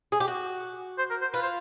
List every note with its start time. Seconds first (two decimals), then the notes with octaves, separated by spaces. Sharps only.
0.12 G#4
0.20 G4
0.28 F#4
0.98 C5
1.10 A#4
1.21 C5
1.33 F4 B4
1.43 C5